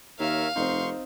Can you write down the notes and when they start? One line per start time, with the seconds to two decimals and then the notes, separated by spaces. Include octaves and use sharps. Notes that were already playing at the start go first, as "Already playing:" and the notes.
0.19 D#2 A#4 C#5 E5 F5
0.56 F1 C4 D#4 C6 C#6